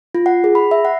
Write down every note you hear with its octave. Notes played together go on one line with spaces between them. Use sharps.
F4
F#5
G#4
B5
E5
F#5